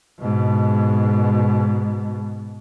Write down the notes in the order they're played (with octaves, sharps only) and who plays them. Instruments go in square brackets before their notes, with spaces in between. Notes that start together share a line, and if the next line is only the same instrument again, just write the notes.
[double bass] G#2 B2